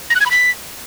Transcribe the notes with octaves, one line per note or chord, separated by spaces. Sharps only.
A#6
F#6
G#6
B5
B6